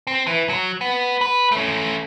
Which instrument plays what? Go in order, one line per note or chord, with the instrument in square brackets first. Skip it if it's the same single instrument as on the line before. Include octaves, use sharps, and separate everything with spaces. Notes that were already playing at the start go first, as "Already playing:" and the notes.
[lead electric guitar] C4
E3
F#3
B3
B4
A3 C#4